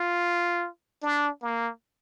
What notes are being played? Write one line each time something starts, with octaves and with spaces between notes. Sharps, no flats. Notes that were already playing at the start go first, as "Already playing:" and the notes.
Already playing: F4
D4
A#3